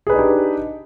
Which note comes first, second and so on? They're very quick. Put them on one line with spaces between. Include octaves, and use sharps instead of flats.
G#4 B4 D#4 D4 G4